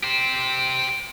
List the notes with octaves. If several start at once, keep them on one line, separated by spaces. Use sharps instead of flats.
G4 C5